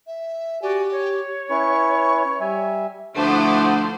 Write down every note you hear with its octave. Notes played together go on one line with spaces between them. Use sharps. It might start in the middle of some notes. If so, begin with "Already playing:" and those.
E5
F#4 G4 D5 G#5
C#5
C#4 E4 B4 C#6
G3 E5 G#5
D2 F3 A3 E4 C5 F#5 D6 D#6